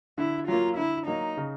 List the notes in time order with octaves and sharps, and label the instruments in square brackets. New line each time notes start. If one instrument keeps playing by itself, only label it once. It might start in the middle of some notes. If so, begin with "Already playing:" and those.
[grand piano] D3 [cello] E4
[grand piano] F#3 A#3 [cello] F4
[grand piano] D3 [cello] E4
[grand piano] F#3 A#3 [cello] D#4
[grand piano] C#3